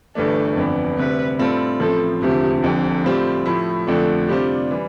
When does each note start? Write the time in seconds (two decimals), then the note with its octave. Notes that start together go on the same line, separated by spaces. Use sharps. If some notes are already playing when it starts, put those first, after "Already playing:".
0.15 G1 G2 E3 A3 D4 A4
0.57 G1 F2 E3 B3 D4
0.98 D2 C3 G3 B4
1.39 A2 G3 C4 F4 A4
1.80 A1 A2 F3 C4 A4
2.21 E1 D2 C3 F3 G4
2.62 F1 F2 D3
3.04 A2 G3 C4 F4 G4 C5
3.46 A2 F3 A3 E4
3.87 F2 D3 F3 A3 D4 A4
4.28 C3 G3 D4 F4 G4 C5
4.71 E3 G3